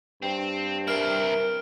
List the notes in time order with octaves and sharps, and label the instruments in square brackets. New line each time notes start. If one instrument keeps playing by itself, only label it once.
[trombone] G2 [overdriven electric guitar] C4
[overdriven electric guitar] C4 E4 [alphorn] A#4 [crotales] F6 D7